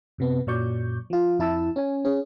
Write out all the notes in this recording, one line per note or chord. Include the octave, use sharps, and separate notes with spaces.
F#2 C3 B3
F#2 A#2 F#3 D5 C#6 G6
F3 F4
F2 E4 A5 E6
C#4 G#5
C#4 G#4